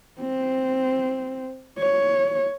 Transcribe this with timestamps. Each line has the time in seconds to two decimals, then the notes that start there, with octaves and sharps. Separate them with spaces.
0.20 C4
1.79 C#5